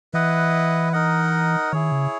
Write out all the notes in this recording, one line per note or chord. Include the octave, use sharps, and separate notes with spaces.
E3 E4 B4 D#5 F#5
D#4 A#4 D#5 F#5
D#3 E4 G#4 C#5
C#3